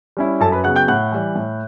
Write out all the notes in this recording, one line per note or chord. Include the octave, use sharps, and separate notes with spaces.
G3 C#4 E4
F#2 A4 A5
B4 B5
C#3 F#3 B3 F#5 F#6
G5 G6
A2 F#5 F#6
E3 G3
A2